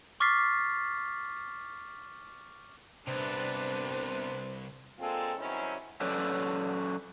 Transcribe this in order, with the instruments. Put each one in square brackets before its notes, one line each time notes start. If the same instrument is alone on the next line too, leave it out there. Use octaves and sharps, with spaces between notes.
[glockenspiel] C#6 D6 F6 A6 B6 C7
[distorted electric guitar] C2 [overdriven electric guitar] C3 B3 [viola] D4 B4 [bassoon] C5
[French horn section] G#3 A#3 C4 D4 F4 A4
G2 D#3 F#3 C4 C#4 E4
[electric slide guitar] F#3 C#4 A4 B4 D5